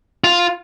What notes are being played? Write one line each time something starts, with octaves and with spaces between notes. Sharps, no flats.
F4